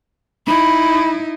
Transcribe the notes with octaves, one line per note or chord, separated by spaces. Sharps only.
D#4 E4 B5